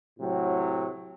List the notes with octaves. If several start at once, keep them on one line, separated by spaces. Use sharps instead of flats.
A2 C3 F#3